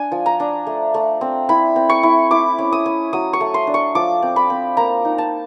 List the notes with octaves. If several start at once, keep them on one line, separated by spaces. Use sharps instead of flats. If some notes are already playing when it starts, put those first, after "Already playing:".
Already playing: D4 G#5
F3
A#5
D4
A3
A3
C4
E4 B5
C4
C#6
E4
E4 D6
C#4
D#6
C#4
F#3 D#6
C#6
A3
C6
D4
C#6
F3 D6
C4
B5
C4
A#3 A#5
D#4
A5